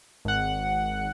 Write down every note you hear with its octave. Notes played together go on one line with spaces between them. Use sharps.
G#1 F#5